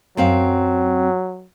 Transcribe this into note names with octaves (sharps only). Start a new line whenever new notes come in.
F#2 F#3 C4 F5